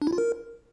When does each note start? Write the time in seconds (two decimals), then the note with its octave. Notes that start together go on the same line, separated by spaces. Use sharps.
0.02 D4
0.07 E4
0.13 F4
0.18 A#4